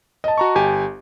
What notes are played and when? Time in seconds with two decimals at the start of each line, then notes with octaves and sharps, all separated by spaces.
0.24 D#5 A5
0.38 F#4 A#5 C#6
0.55 G1 G4 G#5